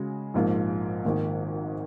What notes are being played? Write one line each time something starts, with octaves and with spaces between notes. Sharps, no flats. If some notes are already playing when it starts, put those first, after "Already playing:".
Already playing: C#3 G#3 F#4
A#1 G#2 F3 A#3 F4
G#1 G#2 D#3 A#3